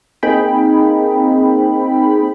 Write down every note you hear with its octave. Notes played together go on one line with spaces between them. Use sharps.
A#3 C4 D#4 G#4 G5 B5